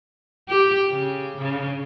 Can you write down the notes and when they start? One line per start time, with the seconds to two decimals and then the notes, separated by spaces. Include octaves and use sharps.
0.48 G4
0.90 C#3
1.37 C#3